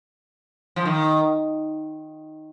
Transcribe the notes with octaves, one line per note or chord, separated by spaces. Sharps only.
F3
D#3